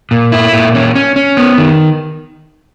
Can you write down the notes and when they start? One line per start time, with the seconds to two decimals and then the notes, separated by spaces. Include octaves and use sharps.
0.11 A#2
0.32 E4
0.53 A#2
0.75 C#4
0.96 C#4
1.16 C#4
1.37 B3
1.58 D#3